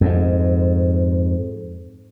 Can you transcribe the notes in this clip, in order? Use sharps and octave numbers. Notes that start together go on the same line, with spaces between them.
F2 G#2